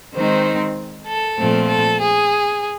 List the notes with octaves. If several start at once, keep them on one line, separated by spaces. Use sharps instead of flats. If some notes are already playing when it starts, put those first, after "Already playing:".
D#3 G#3 C4 D#4 C5
A4
A#2 F3 A3 C4
A4
G#4